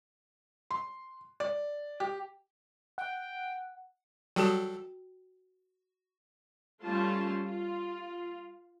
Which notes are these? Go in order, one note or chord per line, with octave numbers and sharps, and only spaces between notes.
C6
D5
G4
F#5 G5
F#3 G3 F#4 A4 G5
G3 A3 C#4 F4 A5 C6
F4